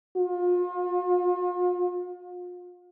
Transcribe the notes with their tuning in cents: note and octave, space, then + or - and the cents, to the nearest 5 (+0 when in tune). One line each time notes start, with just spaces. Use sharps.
F4 +40